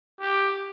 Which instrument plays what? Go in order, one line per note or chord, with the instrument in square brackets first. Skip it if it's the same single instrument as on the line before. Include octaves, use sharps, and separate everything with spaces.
[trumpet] G4